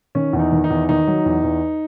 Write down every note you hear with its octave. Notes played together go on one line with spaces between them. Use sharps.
D#3 C#4
E2
D#4
D#3
D#4
E2
D#3 D#4
F#3
E2
E2